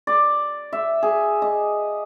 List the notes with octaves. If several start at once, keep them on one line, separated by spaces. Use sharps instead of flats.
D5
E5
G#4
D#5